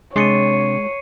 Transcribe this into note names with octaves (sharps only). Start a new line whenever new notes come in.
C3 G#3 D4 C#5 C6 C7 C#7 D#7